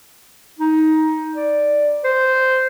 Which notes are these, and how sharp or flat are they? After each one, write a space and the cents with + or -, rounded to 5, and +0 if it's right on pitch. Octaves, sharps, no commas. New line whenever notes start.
D#4 +15
D5 +0
C5 -10